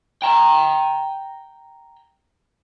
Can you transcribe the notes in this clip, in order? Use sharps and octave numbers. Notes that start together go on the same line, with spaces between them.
G5 A#5